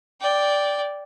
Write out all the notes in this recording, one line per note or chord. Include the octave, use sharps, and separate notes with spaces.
D5 G5